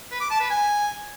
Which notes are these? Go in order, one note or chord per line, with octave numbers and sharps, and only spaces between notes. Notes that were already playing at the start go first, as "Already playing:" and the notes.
B4
D6
A5
B4
G#5